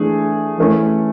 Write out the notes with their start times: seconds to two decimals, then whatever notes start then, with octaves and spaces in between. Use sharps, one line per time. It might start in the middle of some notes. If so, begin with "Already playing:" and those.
Already playing: E3 A3 D4 G#4
0.58 E3 A3 C#4